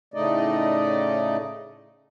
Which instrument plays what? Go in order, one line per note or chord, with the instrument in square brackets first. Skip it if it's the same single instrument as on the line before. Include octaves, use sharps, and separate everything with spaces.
[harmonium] A2 C#3 A3 D#4 D5 D#5